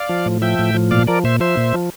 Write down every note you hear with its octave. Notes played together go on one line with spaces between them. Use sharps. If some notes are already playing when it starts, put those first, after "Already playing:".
Already playing: D5 F5
F3
A2
F3 E5 G5
A2
F3
A#2 D5 F5
F3 A#4 D5
A#2 C5 E5
F3 C5 E5
A#2
F3